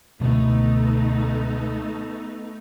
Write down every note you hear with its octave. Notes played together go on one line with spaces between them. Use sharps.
C#2 B2 D3 A3 B3 D#4